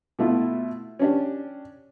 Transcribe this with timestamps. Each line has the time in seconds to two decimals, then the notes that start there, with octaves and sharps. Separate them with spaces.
0.19 B2 A3 E4 F4
0.99 C#4 D4 G4